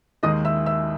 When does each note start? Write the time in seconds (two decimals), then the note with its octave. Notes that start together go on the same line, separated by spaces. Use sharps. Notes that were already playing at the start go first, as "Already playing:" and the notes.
0.23 D#2 D#3 G#3 D#5 D#6
0.45 E5 E6
0.66 E5 E6